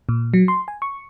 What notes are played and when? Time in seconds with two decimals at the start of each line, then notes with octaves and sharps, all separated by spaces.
0.09 A#2
0.34 F#3
0.48 C6
0.68 G#5
0.82 C#6